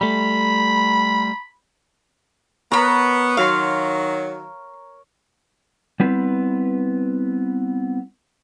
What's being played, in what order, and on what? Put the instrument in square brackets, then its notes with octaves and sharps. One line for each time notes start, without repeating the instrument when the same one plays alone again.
[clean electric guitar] G3 A3 [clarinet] B5
[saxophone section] B3 [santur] A#4 C#5 [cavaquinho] A#5 B5
[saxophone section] D#3 F#3 [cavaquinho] F5 C6
[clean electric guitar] G3 B3 C4 E4 B4